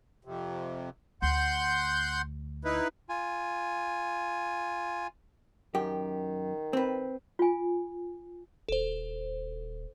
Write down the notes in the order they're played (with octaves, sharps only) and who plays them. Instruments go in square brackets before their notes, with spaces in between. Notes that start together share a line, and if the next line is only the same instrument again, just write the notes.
[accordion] F2 C3
[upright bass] D2 [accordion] F#5 C6 G6
[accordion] D#4 E4 B4
[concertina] F4 G#5
[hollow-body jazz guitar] F#2 G4 [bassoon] D#3
[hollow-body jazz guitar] C4 B4
[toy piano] F4 G#5
[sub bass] D#1 [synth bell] A4 C5